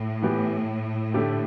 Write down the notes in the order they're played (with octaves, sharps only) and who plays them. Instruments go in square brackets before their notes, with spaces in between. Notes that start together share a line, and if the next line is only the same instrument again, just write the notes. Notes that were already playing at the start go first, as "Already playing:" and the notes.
Already playing: [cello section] A2
[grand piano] E3 B3 G4
D3 A3 G4